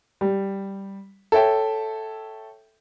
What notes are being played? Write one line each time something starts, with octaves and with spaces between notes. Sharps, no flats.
G3
A4 C#5 E5 G5